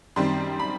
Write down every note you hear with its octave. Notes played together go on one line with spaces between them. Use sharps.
F#2 D#3 G3 C4 C6
B5